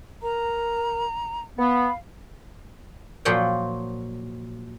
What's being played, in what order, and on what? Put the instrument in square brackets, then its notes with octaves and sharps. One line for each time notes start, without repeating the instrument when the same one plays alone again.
[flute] A#4 [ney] A#5
[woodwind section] B3 [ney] F5 [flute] B5
[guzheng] A#2 F3 F#3 F#5 G5